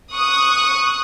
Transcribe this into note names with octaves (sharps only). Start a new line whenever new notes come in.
C#6 D#6 F#6